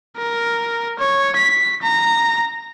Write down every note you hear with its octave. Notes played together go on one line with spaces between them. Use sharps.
A#4
C#5
B6
A#5